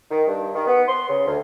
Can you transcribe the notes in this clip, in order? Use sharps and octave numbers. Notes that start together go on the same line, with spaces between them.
D#3
G2
D#3
B3
C6
C#3
D2